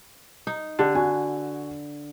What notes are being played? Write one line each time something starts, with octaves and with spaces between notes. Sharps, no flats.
D#4
D3 G4
F#4 G#5